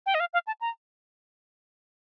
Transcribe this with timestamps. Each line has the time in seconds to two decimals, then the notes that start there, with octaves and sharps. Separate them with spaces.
0.06 G5
0.14 D#5
0.20 F5
0.33 F5
0.47 A5
0.61 A#5